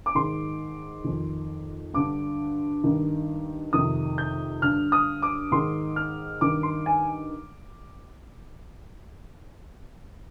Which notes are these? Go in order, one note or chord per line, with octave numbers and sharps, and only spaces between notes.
D6
G#2 D#3 C6
F2 D#3
G2 D3 D6
G2 D#3
F2 C3 D#3 D#6
G6
G2 D3 F6
D#6
D6
G#2 D#3 C6
F6
G2 D#3 D6
C6
G#5